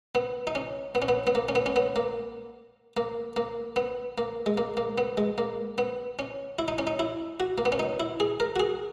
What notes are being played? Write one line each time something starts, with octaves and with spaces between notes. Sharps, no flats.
B3
D#4
C#4
B3
C#4
B3
B3
A#3
C#4
B3
C#4
B3
A#3
A#3
A#3
B3
A#3
G#3
A#3
A#3
B3
G#3
A#3
B3
C#4
E4
D#4
C#4
D#4
E4
F#4
A#3
B3
C#4
D#4
E4
G#4
A#4
F#4
G#4